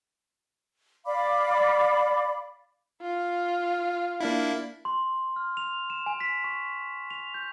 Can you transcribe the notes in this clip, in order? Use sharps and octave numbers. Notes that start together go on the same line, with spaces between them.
D5 F5 B5 D6
F4
A#3 D4 E4
C6
F6
F7
E7
G#5
B6
C#6
F7
G6